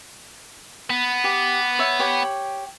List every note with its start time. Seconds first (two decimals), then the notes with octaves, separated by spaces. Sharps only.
0.90 B3
1.24 G4
1.79 C#5 E5
1.99 G4 C#5 G5